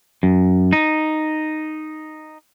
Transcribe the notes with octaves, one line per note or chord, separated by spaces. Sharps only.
F#2
D#4